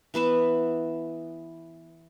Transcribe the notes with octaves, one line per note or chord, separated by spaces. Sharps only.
E3 B3 B4 E5